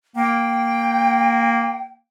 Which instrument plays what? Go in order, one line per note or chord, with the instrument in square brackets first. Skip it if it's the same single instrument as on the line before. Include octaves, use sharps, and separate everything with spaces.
[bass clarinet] A#3 [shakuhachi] G5